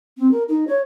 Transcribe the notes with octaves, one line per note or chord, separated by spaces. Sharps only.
C4
A#4
D#4
C#5